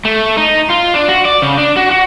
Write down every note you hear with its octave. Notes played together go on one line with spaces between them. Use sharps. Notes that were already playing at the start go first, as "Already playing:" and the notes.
A3
D#4
F4
D4
F#4
D5
C#3
D4
F#4
F#4